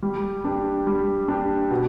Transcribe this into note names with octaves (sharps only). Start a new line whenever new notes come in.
G3
D4 G4
G3
D4 G4
B2